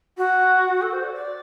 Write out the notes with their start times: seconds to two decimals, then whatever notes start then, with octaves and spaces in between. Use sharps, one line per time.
0.17 F#4
0.81 A4
0.92 C5
1.03 D5
1.14 D5